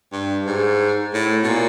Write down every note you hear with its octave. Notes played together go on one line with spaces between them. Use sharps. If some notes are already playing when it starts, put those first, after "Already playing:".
G2
G#2
A2
B2
A#2